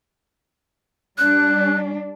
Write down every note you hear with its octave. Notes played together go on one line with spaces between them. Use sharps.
G3 D4 F#6